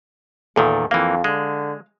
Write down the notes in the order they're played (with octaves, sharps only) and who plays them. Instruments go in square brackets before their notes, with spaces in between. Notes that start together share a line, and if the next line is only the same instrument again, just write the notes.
[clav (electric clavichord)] E2 A#2 D#3 [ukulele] A4
[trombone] F2 [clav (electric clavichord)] E3 A#3 [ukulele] F5
[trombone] D3 [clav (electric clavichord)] G#3